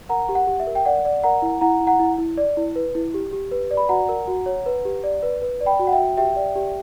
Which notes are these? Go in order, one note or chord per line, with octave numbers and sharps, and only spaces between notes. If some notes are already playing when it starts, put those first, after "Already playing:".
A#4 F#5 A#5
G4
F#5
G4
E5
A#4
G5
D5 F#5
D5
A#4 F#5 A#5
E4
E4 F#5 A#5
E4
F#5 A#5
E4
E4
D5
E4
B4
E4
G4
G4
B4
D5
B5
F#4 F#5 A#5
A#4
F#4
C#5
B4
G4
D5
B4
B4
D5
G5 B5
F#4
F#5
E5 G5
F#4
G4 E5 G5
D5
G4